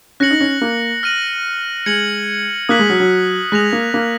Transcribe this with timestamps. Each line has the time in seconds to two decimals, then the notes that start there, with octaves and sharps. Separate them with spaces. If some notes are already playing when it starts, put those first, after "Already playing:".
0.20 C#4 F#6 A#6 C#7 F#7
0.30 D#4
0.41 C#4
0.61 A#3
1.03 F6 A#6 D#7 F#7
1.86 G#3 G#6 C#7 F#7
2.69 A#3 D#6 F#6 B6 F#7
2.79 G#3
2.90 F#3
3.00 F#3
3.52 G#3 F#6 A#6 F7
3.73 A#3
3.94 A#3